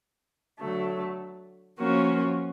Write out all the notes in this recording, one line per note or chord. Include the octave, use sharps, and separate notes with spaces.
D3 F#3 A3
F3 A#3 C#4 F#4